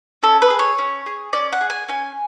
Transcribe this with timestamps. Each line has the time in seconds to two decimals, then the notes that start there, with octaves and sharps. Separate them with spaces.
0.23 C#4 A4
0.42 B4
0.50 G#4
0.59 C#5
0.78 C#4
1.06 G#4
1.33 C#4 D5
1.53 F#5
1.61 G#4
1.70 G#5
1.89 C#4 G#5